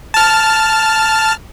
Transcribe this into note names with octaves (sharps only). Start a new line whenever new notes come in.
A5 F6